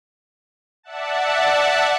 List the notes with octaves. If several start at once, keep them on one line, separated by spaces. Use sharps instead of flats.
D5 E5 F#5 A5